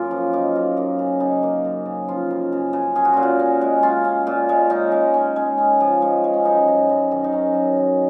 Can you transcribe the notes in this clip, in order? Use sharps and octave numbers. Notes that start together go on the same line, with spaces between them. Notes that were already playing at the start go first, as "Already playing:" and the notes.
Already playing: F#2 A#3 F4
F3
A#3 D#4
F#2
A#3
C#3
C#3 D#4
A#3
F#2
C#3
F3 F4
F#2
C#3
C#3
C#4 G#4
F#4
A#2 F4
F#4
C#4
G#3
C#4 F4
C#4
A#2
G#3
C#4 D#4
G#3
C#4
G#3
C#4
F3
G#3
G#3
C#4
F#2 D#4
F#3
F#2
D#3
D#4
F#2 C#4
F#3
D#3